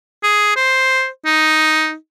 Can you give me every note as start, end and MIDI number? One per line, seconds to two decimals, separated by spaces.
0.23 0.55 68
0.56 1.08 72
1.25 1.94 63